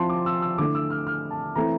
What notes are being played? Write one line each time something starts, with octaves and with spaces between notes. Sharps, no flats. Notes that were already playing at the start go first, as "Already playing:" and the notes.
Already playing: F3 C4 E4 A5 C6
D6
E6
E6
D3 A3 E4 D6
E6
F6
F6
A5
E3 A3 C4 E4 A#5